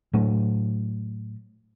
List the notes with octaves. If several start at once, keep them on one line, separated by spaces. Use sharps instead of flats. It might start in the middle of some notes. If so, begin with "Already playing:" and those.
A2 F#3 A3